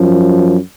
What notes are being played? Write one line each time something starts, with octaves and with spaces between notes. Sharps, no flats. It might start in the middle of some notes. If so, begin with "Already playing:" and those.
Already playing: F#2 F3